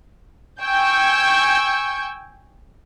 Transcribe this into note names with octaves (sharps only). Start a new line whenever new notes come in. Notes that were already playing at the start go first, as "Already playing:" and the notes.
G5 G#5 C#6 E6 G6